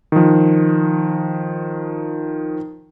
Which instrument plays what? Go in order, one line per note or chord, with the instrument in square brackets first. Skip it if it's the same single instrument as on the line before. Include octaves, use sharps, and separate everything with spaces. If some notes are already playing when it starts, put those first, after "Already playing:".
[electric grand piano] D#3 F3